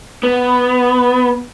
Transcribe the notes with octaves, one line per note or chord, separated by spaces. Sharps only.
B3